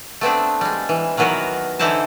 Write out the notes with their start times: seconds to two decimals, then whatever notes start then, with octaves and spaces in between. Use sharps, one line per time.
0.21 A3 B3 C4 D4
0.61 G3 G#3
0.89 E3
1.17 D#3 E3 F#3 B3 F#4 A#4
1.79 D3 E3 D#4 E4 C5 A5